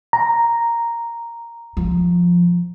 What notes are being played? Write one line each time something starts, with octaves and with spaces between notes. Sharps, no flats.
A#5
F3